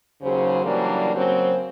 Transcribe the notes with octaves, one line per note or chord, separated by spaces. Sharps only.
D#2 C#3 F#3 G#4 C5
C#3 E3 F#3 G3 A#3 D4
C#3 F#3 A#3 C4